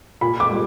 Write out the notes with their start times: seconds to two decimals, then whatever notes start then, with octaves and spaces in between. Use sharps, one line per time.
0.21 A#2 B5
0.40 D6
0.50 G3